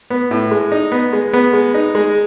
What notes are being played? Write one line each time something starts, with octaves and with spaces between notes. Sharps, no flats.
B3
A2
G#3
D#4
B3
G#3
B3
G#3
D#4
G#3